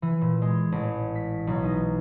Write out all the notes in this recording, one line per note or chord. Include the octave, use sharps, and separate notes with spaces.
E3
A#2
G#3
A1
B6
B1
D#4